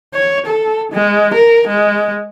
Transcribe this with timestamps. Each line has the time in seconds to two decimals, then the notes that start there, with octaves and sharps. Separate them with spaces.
0.14 C#5
0.47 A4
0.92 G#3
1.34 A#4
1.68 G#3